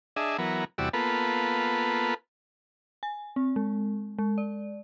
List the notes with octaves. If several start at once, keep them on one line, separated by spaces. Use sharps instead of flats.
D4 G#4 D#5 E5
E3 F#3 B3 A#4
E2 C3 G3 F#4 D5 E6
A#3 B3 F4 A4 B4
G#5
C4
G#3
G#3
D5